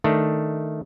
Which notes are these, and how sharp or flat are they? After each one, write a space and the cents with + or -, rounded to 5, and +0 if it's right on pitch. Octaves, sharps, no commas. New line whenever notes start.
D#3 +0 A3 +0 D4 +0